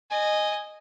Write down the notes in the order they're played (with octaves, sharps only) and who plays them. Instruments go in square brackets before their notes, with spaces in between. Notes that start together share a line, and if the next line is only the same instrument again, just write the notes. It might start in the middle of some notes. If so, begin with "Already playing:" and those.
[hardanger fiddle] D#5 [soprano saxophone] G#5